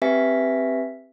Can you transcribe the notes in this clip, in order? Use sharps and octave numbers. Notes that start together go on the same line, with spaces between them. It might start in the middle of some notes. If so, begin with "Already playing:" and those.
C4 G4 B4 E5 G#5 B6